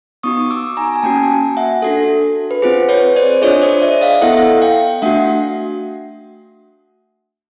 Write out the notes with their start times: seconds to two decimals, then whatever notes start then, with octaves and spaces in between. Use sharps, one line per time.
0.23 B3 D#4 F#4 C#6 D#6
0.51 D6 E6
0.77 G#5 A#5
0.96 G#5
1.03 A#3 C#4 F#4 G5 A5
1.57 E5 F#5
1.82 D4 F#4 A4
2.51 B4
2.62 C4 F4 G#4 C5
2.89 B4 C#5
3.16 C5 D5
3.42 D4 F4 G#4 C#5 D#5
3.62 C5 D5
3.82 D5 E5
4.01 D#5 F5
4.22 B3 E4 A4 E5 F#5
4.62 F5 G5
5.02 A3 D4 F#4 E5 F#5